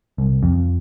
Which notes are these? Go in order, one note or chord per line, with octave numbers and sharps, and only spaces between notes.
C2
F2